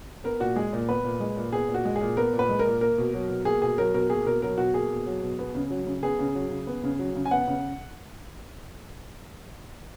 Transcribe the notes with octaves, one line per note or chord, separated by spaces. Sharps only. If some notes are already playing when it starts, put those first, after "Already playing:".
B3 A#4
A#2 F#4
G#3 G#4
A#2
B3 B4
A#2
G#3
A#2
B3 G#4
A#2
F#4
G#3
G#4
A#2
B3 A#4
A#2
B4
G#3
A#4
A#2
A#3 A#4
B2
F#3
B2
A#3 G#4
B2 G#4
F#3 A#4
B2 A#4
A#3 G#4
B2 A#4
F#3 A#4
B2 F#4
A#3 G#4
B2
F#3
B2
B3
C#3
F#3
C#3
B3 G#4
C#3
F#3
C#3
B3
C#3
F#3
C#3
G#5
B3 F#5
C#3